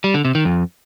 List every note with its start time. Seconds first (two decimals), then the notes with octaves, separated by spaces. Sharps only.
0.04 G3
0.14 D3
0.25 C3
0.35 D#3
0.45 F2